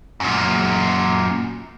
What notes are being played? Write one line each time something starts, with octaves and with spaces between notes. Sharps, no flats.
F#2 A#2